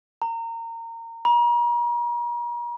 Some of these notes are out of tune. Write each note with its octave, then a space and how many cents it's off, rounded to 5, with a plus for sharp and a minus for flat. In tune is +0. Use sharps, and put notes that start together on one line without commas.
A#5 -25
A#5 +40